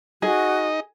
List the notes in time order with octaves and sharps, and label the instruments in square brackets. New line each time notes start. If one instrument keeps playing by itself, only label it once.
[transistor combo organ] D#4 D#5 [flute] F#4 [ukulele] G#4